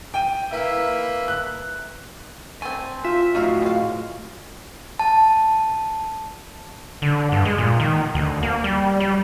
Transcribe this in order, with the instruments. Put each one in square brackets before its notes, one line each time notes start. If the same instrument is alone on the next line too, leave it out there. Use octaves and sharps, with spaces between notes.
[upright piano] G5 D#7
[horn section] A#3 B4 E5 [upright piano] E4
[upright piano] F#6
[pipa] A3 C4 [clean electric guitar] G#5
[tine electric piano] F4 [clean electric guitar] E5
[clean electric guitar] A2 F#4 [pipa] D#4 E5 F5
[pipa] G#3 F5
[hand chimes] A5
[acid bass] D3
G2
G#3
A#2
D#3
D2
A#3
G3
G3